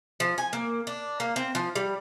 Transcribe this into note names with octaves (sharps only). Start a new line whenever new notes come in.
F3
G#5
A#3
D4
A#3
C4
F3
G3